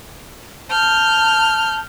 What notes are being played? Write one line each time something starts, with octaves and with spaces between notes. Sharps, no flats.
A5 F6 G6